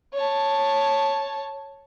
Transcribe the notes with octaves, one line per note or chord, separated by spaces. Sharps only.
C#5 A5